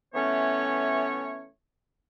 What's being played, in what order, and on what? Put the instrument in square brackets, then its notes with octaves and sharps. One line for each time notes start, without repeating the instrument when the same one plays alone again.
[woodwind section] E3 A3 B3 C#4 C#5